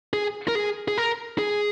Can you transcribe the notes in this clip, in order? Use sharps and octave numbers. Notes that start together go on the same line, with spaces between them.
G#4
A#4
G#4
G#4
A#4
G#4